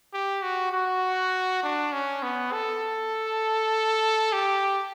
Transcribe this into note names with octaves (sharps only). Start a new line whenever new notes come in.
G4
F#4
F#4
D4
C#4
B3
A4
G4